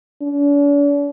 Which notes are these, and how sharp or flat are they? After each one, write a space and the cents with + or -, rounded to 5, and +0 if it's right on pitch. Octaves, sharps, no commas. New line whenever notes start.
D4 -45